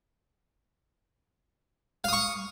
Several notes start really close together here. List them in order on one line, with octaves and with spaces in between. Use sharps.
F5 D#6 C#6